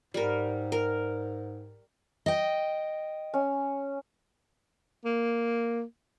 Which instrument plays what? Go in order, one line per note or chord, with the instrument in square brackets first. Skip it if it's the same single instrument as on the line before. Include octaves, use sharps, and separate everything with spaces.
[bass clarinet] G#2 [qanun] G3 A#4
[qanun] A#4
[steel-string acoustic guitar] D#5 G5
[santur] C#4
[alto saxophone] A#3